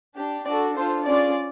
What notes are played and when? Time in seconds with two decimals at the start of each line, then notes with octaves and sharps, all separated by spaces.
0.17 D4 G4
0.47 D4 F#4 A4 D5
0.76 D4 F4 A4 C5
1.06 C#4 F4 G#4 D5